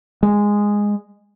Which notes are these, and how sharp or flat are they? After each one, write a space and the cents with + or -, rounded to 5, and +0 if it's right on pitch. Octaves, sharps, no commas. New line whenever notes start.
G#3 -10